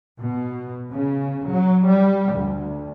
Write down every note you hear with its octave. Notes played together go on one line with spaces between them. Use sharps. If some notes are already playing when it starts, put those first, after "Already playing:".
B2
C#3
F#3
G3
D2